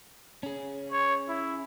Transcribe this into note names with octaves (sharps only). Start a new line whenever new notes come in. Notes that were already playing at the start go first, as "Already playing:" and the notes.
C#4 G#4
C#5
E4